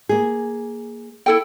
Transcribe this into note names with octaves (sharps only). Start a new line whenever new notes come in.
A#3 G#4
E4 A4 G5